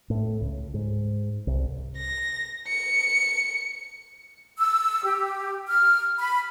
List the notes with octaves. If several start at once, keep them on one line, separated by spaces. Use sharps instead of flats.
A2
C#2
G#2
C2
A#6
C#7
E6
G4
F6
B5